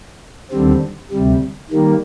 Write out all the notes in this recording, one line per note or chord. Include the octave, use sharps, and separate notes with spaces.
D#2 D3 G3 C4
D2 C3 G3
D#3 G3 A#3